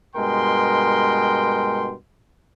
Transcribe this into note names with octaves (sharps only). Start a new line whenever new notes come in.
G2 B2 G#3 A#4 G5 C6